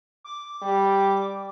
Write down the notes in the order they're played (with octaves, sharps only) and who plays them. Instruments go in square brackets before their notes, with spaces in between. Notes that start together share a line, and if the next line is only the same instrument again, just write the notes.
[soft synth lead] D6
[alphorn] G3